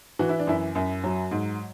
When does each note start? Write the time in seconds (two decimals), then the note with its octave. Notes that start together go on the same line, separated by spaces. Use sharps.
0.19 E3 F#4
0.29 E4
0.39 D4
0.47 F#2 E4
0.75 F#2
1.04 F#3
1.31 G#2